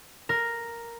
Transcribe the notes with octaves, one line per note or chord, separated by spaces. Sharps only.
A#4